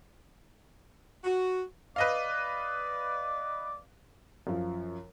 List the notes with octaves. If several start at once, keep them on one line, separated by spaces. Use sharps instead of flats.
F#4
B4 D5 D#5 F5
F#2 F3